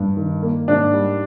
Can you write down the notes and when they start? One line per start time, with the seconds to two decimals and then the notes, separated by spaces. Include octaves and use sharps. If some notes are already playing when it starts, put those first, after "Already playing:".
Already playing: G2
0.17 D#3
0.42 A#3
0.68 G#2 D4
0.93 G3